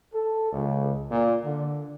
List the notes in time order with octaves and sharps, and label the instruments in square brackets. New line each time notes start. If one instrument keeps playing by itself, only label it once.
[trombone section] A4
C#2
A#2
D3